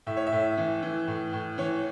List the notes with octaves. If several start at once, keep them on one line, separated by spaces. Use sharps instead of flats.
A2 E5
C#5
E5
A2
E3
E3
A2
A2
E3 C#5